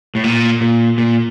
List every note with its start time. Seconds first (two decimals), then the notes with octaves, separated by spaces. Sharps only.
0.15 A2
0.24 A#2
0.61 A#2
0.98 A#2